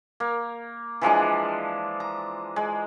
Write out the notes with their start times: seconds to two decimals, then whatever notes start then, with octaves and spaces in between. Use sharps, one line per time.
0.20 A#3
1.01 E3 F3 G#3 D4
2.00 A#5
2.56 G#3